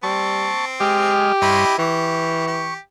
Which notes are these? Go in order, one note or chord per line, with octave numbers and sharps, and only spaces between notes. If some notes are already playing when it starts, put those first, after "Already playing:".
G3 C4 A5 C#6
G#3 G4 D#5 F6
G2 E4 C#5 D#5 B5 C6
E3 G4 C#6
G4